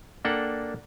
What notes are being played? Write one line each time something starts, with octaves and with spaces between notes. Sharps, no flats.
A#3 D4 A4 F#5 G5